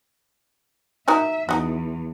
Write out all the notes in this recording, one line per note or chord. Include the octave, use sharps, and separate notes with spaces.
D#4 F#4 A#4 E5
E2 D#4 F#4